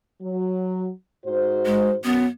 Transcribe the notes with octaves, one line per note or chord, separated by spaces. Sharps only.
F#3
G#2 F#4 C5
G#3
F#2 B3